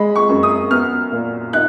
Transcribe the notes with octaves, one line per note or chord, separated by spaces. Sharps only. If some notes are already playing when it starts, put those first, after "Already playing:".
Already playing: G#3 B5
C#6
F#2
D#6
B3 F6
A#2
D#4 F#6